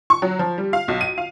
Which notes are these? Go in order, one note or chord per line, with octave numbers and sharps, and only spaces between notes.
C#6
F#3
F3
G3
F5
B1
D#7
F5